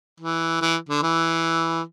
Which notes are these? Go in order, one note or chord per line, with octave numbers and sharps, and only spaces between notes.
E3
E3
D3
E3